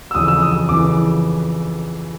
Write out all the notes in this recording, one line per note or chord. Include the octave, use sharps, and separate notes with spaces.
E6
F2 C#3 E3 D#6
E6
D#6
F2 C#3 E3 D6